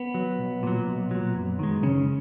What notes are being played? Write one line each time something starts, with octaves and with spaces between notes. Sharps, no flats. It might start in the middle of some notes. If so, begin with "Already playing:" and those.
Already playing: B3
F#3
B1
A#2 F#3
B1
A#2 F#3
F#2
D#3 G#3
F#2 C#3 C#4